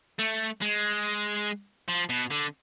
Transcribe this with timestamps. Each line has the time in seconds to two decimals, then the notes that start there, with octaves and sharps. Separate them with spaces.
0.19 A3
0.62 G#3
1.88 F3
2.09 B2
2.31 D3